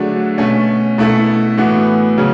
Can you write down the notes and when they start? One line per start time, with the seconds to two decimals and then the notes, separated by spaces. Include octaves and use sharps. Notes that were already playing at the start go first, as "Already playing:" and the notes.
Already playing: D3 F#3 A3 D4 G#4
0.38 B2 A3 C#4
0.98 B2 A3 E4 A4
1.58 A2 E3 B3 F#4
2.18 C#3 F#3 C#4